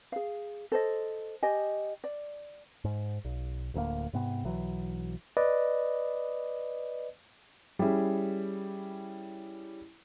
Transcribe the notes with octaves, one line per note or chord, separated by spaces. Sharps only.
G#4 F5
A4 C5 D#5
G4 D#5 G#5
D5
G#2
B1
D1 D2 D3 A#3
G#2 C3 B3
B1 E3 F#3
B4 D5 D#5
G3 C#4 E4 G#4